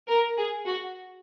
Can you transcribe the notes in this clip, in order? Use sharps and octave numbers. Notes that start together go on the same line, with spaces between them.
A#4
G#4
F#4